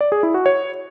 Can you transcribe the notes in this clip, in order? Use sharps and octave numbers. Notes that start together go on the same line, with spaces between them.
D5
G#4
E4
F#4
C#5